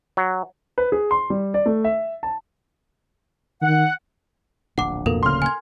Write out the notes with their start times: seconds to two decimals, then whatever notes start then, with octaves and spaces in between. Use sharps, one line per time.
0.17 F#3
0.78 B4
0.92 G#4
1.11 C6
1.30 G3
1.54 D5
1.66 A3
1.84 E5
2.23 A5
3.62 D#3 F#5
4.78 D1 A#1 D4 F#5 D6
5.06 F2 B2 A#3 A4 A#4
5.23 D2 C#3 A#3 C6 F6
5.42 G#5 G#6